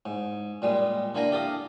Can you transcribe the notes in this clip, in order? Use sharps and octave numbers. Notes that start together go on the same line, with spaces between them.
G#2
A#2 G3 G#3
D3 A#3 E4 G#5 A#5
G4 A4 F5 D#6